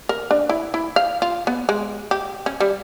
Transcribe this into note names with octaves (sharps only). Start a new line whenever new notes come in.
A#4
D4
E4
E4
F5
F4
B3
G#3
G4
C#4
G3